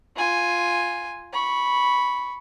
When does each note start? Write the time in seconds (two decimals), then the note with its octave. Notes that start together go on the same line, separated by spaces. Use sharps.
0.16 F4 G#5
1.33 B5 C#6